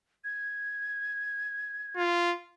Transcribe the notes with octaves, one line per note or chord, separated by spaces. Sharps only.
G#6
F4